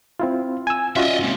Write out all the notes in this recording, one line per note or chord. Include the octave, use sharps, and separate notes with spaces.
C4 E4 F4
G#5 E6
C#4 F4 F#4 D#5 E5
G#2 C3